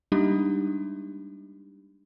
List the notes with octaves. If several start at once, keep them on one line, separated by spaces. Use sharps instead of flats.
G3 G#3 A#3 D4 D#4 G4